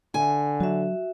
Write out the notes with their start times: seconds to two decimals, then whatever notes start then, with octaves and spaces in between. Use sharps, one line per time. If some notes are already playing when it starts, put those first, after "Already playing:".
0.14 D3 G#5
0.60 F#3 F#4 E5